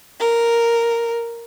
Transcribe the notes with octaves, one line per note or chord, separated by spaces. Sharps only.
A#4